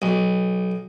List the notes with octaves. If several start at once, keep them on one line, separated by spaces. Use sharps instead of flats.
B1